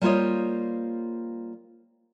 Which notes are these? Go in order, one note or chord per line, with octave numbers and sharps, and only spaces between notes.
G3 A#3 F4 C5 C#5 D#5